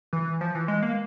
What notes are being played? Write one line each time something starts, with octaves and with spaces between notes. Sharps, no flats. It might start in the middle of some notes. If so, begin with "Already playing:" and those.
E3
F3
E3
G#3
A#3